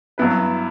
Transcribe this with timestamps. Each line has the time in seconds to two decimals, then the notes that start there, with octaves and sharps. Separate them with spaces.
0.18 G2 F#3 B3 E4 B4